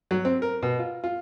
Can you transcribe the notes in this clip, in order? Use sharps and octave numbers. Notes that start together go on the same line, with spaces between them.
F#3
C4
A#4
B2
F4
F4